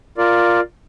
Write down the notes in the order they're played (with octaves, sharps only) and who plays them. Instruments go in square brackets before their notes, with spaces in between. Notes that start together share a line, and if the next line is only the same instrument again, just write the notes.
[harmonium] F4 A#4 D5